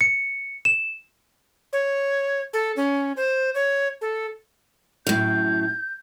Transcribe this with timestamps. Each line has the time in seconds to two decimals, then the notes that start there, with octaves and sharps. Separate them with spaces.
0.01 C#7
0.65 E7
1.73 C#5
2.53 A4
2.76 C#4
3.17 C5
3.55 C#5
4.01 A4
5.07 F#2 A2 G6